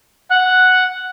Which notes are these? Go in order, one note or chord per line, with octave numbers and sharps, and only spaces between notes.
F#5 F#6